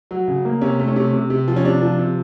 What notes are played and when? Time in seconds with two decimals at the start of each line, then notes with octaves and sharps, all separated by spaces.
0.11 F#3
0.28 C#3
0.45 A#3
0.61 C3 C#4
0.80 A3
0.88 C#4
0.96 C3
1.13 C3
1.30 C3
1.48 F3
1.56 C#4
1.65 C3 D4
1.82 F3
1.99 C3